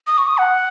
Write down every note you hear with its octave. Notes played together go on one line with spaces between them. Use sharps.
D#6
C#6
D#6
F#5